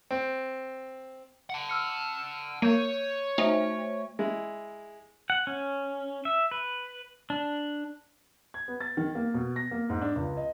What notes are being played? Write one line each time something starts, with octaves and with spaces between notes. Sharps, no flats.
C4
F#5 A5
E6 F6 C#7
A#3 C#5 G6 D#7
A3 D#4 C5 E5
G#3 E4
F#5
C#4
E5
B4
D4
G#6
B3
A6
D#3
A#3
B2
A#6
A#3
G#2
D4
C#2
D#5